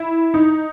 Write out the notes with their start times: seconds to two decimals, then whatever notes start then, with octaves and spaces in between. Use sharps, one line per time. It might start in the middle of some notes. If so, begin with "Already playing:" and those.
Already playing: E4
0.34 D#4